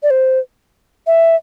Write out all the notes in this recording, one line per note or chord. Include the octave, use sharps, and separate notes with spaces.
D5
C5
E5